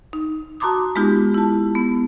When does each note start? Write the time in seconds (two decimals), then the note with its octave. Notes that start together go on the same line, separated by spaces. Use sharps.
0.13 D#4
0.60 F#4 A5 A#5 C6 D6 D#6
0.96 G#3 B3 D#4 F4 G4
1.34 E4 A5
1.75 B3